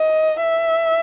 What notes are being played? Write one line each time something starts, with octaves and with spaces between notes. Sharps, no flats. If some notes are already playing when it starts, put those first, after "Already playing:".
Already playing: D#5
E5